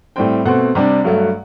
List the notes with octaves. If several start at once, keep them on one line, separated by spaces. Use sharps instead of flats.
A2 G3 C4 G5
B2 A3 C4 F#5
C3 G3 D4
G2 F#3 A3